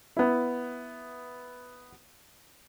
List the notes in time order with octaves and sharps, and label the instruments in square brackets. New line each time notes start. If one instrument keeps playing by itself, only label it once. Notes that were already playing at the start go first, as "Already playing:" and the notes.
[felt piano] B3 E4